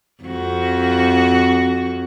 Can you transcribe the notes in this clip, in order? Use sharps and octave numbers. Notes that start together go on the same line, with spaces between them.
F2 F#4